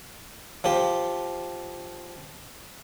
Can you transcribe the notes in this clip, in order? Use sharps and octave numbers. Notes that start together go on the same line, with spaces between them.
F3 G4